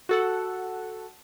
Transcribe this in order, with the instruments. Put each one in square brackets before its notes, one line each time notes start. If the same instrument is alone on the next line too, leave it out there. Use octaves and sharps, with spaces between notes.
[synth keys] F#4 A4 F#5